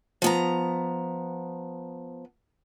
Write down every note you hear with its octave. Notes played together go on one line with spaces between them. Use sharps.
F3 B3 A#5